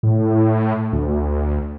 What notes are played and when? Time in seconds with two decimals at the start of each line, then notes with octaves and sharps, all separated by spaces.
0.03 A2
0.93 D2